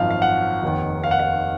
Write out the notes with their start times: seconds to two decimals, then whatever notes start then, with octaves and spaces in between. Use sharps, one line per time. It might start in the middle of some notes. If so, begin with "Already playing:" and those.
Already playing: G#1 F#2 F3 F5
0.11 F5
0.22 F#5
0.63 F1 D#2 D#3
1.04 F5
1.11 F#5
1.19 F5